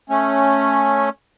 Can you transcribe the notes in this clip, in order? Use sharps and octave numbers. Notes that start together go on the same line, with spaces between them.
A3 C#4